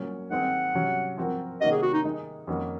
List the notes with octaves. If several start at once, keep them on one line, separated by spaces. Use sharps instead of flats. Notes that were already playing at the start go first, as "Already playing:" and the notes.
Already playing: A#2 F#3 C#4
D#3 G#3 C4 F#5
C3 F#3 C#4
F3 C4 F#4 A#4
C3 D#3 A#3 C#4 F#4 D#5
G#4
F#4
D#4
D#3 G#3 D#4
F2 D#3 A#3 C#4 F#4